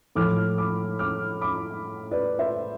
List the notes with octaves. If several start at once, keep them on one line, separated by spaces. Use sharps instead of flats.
A2 F3 A3 D6 F6
B5 D6
D6 F6
B5 D6
B4 D5
C5 E5